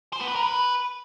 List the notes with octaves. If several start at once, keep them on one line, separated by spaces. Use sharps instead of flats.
C5
B3
B4
A#4
B4